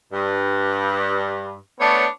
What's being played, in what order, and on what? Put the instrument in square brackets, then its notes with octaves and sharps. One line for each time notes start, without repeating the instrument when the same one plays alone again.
[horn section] G2
A3 B3 D4 C#5